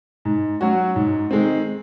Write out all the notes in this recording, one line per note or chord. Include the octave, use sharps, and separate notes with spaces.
G#2
F#3 C#4 F#4
G#2
D#3 G#3 C4